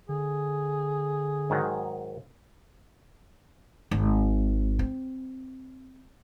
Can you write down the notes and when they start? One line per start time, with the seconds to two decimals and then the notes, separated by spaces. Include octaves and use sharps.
0.09 D3 G#4
1.50 G#2 D#3 F#3
3.91 G#1
4.79 C4